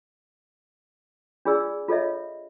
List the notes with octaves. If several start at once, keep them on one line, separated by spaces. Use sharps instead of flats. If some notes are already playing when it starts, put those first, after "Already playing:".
D4 F4 G#4 D5 E6
F4 A4 C#5 D#5 E5